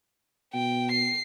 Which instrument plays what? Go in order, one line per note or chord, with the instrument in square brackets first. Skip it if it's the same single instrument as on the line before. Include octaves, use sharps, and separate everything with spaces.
[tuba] B2 [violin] G5
[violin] C7